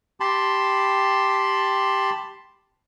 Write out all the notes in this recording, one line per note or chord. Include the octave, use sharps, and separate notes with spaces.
G4 A5 B5 C6